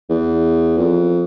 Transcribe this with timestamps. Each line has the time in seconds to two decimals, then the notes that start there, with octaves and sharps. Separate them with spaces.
0.10 E2
0.78 F2